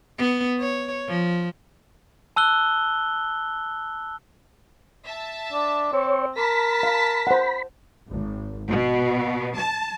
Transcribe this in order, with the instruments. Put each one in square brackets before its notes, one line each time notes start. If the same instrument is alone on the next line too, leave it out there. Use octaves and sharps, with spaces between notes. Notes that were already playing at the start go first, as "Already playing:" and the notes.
[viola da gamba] B3
C#5
F3
[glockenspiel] A5 E6 F#6 G7
[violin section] E5 A5
[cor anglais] D4
[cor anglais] C4 [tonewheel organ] C#5
[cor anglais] A#4 [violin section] A5 A#6 B6 [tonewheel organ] B5
[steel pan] F5
C5 F#5
[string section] G#1
B2
A5